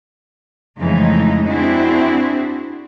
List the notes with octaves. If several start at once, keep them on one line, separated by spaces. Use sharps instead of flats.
F2 C#3 E3 G#3 A3 D#4
C4 D4 E4 F#4 G#4